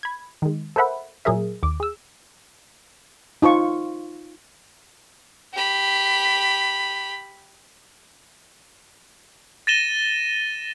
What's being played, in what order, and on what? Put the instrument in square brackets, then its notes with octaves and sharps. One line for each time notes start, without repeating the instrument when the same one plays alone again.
[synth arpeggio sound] B5 G#6
D#3 G#3
A4 A#4 C5 E5 F#5 B5
A#2 F#3 G#4 A#4 E5
D#2 D6
G#4 E6
[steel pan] D#4 F4 C5 C#6
[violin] G4 B5
[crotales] A6 A#6 D#7 E7 G7